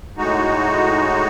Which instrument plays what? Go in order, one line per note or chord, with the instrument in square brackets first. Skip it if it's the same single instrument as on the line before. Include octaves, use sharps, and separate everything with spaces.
[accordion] A2 G#3 D#4 F#4